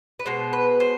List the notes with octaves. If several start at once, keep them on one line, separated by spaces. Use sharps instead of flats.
B4
B2 G#3 B3 C5
B4
C5